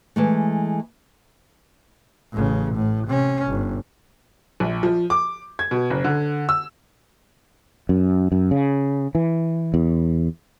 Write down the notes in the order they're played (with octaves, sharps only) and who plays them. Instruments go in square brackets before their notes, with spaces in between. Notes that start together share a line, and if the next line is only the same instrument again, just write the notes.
[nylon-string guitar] E3 G#3 A3
[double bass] A1 C#3
A2
C3 C#4
G1
[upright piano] A#1
F3
D6
G#6
B2
F#1
D3
E6
[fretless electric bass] F#2
F#2
C#3
E3
E2